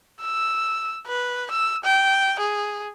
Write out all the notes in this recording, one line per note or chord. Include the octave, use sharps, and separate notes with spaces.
E6
B4
E6
G5
G#4